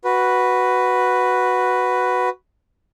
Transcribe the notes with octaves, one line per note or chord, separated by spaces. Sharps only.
F#4 B4